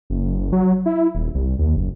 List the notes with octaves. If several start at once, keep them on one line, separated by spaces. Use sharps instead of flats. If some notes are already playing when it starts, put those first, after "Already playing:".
F#1
F#3
E4
D#1
C2
D#2
F#1